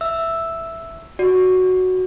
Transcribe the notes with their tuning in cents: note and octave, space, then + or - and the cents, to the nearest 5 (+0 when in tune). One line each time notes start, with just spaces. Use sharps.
E5 +0 E6 +0
F#4 +0 D5 +0